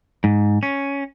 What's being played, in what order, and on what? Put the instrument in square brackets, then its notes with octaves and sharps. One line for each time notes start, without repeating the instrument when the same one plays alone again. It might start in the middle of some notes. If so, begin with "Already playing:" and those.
[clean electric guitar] G#2
C#4